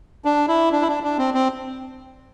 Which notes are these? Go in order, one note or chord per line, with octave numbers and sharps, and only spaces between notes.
D4
E4
D4
E4
D4
D4
C4
C4